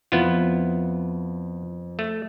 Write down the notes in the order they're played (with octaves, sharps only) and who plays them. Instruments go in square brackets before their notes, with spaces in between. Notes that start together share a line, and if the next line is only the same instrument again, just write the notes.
[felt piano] F2 [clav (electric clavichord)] B3 E4 F4
[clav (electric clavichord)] A3